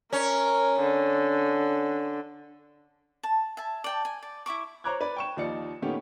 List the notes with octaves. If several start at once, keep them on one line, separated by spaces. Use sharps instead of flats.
C#4 A#4
D3
A5
E5 G#5 A5
D5 G5 A5
G#5
D5
E4 E5 C#6 D6
C5 C#5 A#5 D6 F#6 G#6
B4 D5
G5 C#6 E7
D#2 F3 D#4 F4 D5 C#7
A#2 D#3 A3 B3 C#4 G4